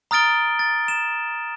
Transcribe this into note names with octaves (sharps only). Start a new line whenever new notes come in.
A#5 D#6 F6 A6 D7 G7
A6
E7